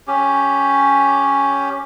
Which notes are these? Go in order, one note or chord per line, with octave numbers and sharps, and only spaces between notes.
C#4 G4